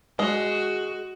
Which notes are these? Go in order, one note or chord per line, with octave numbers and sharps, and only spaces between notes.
G#3 F#4